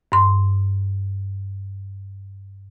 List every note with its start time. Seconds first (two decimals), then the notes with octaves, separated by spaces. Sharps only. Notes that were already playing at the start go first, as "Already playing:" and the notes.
0.12 G2 C6